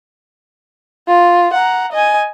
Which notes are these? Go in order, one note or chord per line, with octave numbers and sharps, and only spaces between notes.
F4
F#5 A#5
D#5 G#5